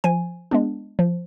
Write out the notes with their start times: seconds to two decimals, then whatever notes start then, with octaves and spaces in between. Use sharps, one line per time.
0.04 F3 G#5
0.51 G#3 B3 D4
0.99 F3